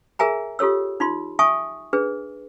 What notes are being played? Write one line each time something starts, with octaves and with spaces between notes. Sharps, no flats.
G#4 A#4 E5 G#5 A#5
F4 G4 A4 C#5 E6
D#4 F4 C6
E5 G#5 A5 C#6 D#6
D4 G#4 B4